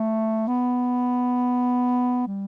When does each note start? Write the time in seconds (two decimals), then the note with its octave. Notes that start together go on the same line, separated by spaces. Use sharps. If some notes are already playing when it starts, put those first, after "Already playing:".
Already playing: A3
0.47 B3
2.27 G3